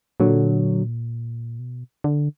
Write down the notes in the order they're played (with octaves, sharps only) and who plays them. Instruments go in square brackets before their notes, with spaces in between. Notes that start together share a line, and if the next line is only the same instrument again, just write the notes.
[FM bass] A#2 [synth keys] D3 F#3
[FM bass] B2
D3